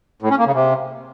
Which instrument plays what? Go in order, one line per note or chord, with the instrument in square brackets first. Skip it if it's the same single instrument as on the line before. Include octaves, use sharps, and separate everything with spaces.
[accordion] A2
C#4
A#3
C#3
C3